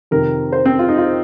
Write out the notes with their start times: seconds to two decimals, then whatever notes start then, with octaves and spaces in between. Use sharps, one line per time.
0.11 F2 C3 D#3 A#4
0.52 C5
0.66 C4
0.79 F4
0.88 D#4
0.98 F4